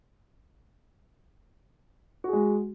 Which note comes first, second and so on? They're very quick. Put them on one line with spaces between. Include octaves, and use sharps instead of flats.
F#4 G#4 G#3